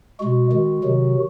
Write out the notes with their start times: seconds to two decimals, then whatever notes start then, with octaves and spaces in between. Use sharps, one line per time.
0.20 B2 G#3 F#4
0.52 D#3 G#3
0.84 C3 D#3 F#3